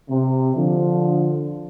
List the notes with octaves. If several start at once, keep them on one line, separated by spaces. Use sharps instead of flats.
C3
D3 F3